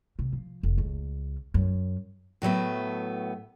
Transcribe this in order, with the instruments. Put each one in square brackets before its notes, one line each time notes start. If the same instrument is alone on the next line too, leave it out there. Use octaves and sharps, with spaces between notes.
[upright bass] C3
F3
F1
C#2
F#2
[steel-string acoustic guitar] A2 F#3 A3 B3